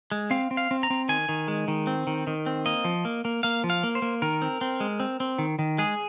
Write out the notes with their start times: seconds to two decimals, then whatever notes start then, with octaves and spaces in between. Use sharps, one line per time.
0.12 G#3
0.31 C4 F5
0.51 C4
0.57 F5
0.71 C4
0.83 A#5
0.90 C4
1.09 D#3 G#5
1.29 D#3
1.48 G#3
1.68 D#3
1.87 C4
2.07 D#3
2.27 D#3
2.46 C4
2.66 A#3 D#5
2.85 F3
3.05 A#3
3.25 A#3
3.43 A#3 F5
3.64 F3
3.70 F5
3.83 A#3
3.95 C5
4.02 A#3
4.22 D#3 A#4
4.42 C4
4.61 C4
4.80 G#3
5.00 C4
5.20 C4
5.38 D#3
5.59 D#3
5.78 G#3 G#4